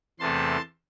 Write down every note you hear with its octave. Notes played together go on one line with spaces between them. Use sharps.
E2 C3 E3 A3 A5 C6